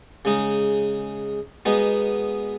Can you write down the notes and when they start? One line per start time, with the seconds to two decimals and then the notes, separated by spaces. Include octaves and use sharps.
0.25 C#3 G#3 D#4
1.65 B2 G#3 B3 D#4